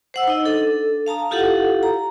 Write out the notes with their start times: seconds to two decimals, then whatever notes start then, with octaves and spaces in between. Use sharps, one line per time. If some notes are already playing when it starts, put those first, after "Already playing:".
0.14 C5 F#5 E6
0.28 D#4 D#5
0.44 D4 A4
1.06 F5 A5 A#5 D#6
1.31 E4 F4 G4 A4 F5 F#5
1.83 A#5